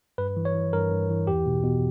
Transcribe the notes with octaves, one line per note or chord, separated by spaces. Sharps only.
G2 B4
E3
C#5
E3
G2 A#4
G2
E3
E2 G4
B2
B2